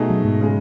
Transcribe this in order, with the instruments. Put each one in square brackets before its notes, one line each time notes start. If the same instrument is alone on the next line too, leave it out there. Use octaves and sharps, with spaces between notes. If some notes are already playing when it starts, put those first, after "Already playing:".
Already playing: [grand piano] B2 A3 D#4 G#4
[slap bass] F#3
G#2
[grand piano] C#3 G#3